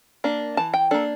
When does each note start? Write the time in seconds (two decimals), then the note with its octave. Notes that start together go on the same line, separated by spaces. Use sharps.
0.24 A#3 D4
0.57 E3 A5
0.74 G5
0.91 A#3 D4 A4